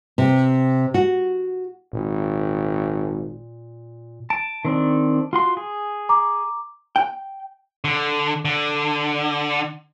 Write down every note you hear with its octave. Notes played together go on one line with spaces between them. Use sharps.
C3
F#4
G#1 A#2
A5 D7
D#3 C4 D4
F4 F#4 C6
G#4
A#5 D6
G5
D3
D3